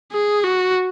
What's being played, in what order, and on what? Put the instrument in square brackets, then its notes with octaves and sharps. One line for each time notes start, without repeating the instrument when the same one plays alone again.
[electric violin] G#4
F#4